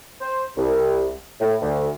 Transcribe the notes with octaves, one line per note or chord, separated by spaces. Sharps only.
C5
C2
A2
D2